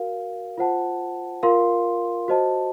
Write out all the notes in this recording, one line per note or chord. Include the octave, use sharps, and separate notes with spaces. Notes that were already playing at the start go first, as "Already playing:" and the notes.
Already playing: F#4 A#4 F5
F4 C5 F#5 A5
F4 A#4 F5 C6
F#4 C5 D#5 A5